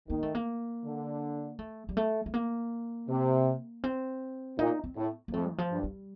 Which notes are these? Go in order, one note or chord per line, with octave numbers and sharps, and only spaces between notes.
D#3 A#3
A3
A#3
D3
A3
G3
A3
A3
A#3
C3
C4
A#2 D#4
C4
A2
A#3
F2 A3
D#3
F3
G2
G3